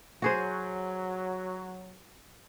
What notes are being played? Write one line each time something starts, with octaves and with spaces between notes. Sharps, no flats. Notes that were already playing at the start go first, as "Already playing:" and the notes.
F#3 F#4 G#4 C5